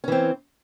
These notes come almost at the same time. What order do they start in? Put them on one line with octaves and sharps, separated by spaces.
C#4 E3 C4